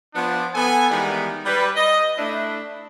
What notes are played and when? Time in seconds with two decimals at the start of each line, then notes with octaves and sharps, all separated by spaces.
0.15 F3 B3 D4
0.55 B3 A4 G#5
0.91 D#3 E3 G3 G#3 B3
1.45 G3 B4
1.75 D#5
2.17 A3 D4 E4